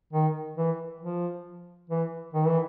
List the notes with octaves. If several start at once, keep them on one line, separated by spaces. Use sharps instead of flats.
D#3
E3
F3
E3
D#3
E3